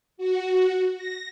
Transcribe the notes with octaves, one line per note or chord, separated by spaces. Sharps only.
F#4
A#6